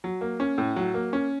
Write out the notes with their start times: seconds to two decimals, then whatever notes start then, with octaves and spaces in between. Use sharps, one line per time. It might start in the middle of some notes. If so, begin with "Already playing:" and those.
0.04 F#3
0.21 A#3
0.40 C#4
0.58 A2
0.76 F#3
0.94 A#3
1.13 C#4